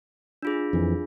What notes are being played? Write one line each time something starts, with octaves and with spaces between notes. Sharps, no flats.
D4 F4 G#4
F2 E3